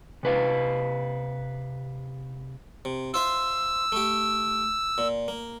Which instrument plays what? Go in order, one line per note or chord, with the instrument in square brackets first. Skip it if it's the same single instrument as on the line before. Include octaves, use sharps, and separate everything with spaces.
[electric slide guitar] C3 B4 F5
[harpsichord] C3
[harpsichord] F4 C5 E5 [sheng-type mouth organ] E6
[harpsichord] A3 G4
A#2
A#3